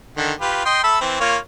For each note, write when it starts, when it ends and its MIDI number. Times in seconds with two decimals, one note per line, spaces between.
0.17 0.32 50
0.17 0.32 51
0.41 0.61 65
0.41 0.61 67
0.41 0.61 71
0.65 0.82 75
0.65 0.82 79
0.65 0.82 84
0.83 1.01 69
0.83 1.01 76
0.83 1.01 83
1.01 1.17 52
1.01 1.17 60
1.20 1.37 58
1.20 1.37 65
1.20 1.37 73